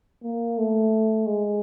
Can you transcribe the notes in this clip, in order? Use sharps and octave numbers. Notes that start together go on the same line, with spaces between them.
A#3
A3
G#3